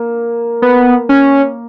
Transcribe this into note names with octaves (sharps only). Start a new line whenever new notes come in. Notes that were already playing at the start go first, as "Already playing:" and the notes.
Already playing: A#3
B3
C#4